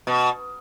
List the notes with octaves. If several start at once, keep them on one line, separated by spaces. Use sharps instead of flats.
B2